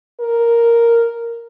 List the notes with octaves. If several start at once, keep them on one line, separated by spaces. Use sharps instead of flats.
A#4